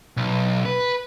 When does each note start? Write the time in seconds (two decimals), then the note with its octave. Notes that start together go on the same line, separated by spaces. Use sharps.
0.17 B1
0.66 B4